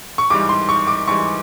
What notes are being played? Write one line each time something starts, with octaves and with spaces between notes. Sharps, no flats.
C#6
G#2 E3 G3 D6
C6
C#6
D6
G#2 E3 G3 C#6